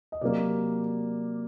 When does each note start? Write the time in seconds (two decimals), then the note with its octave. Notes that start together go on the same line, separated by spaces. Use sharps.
0.12 D#5
0.21 C3 F#3 A#3 D5